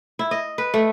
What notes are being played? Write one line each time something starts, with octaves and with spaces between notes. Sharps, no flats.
E4
D#5
B4
A3